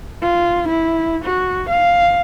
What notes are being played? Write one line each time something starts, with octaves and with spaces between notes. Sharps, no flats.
F4
E4
F#4
F5